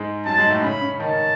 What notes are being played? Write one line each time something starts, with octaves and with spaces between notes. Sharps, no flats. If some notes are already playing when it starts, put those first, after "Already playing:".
Already playing: G#2 G#3
F#2 F#3 A5
G#2 G#3
A2 A3
C#3 C#4 B5
C#3 C#4
D#3 D#4 A5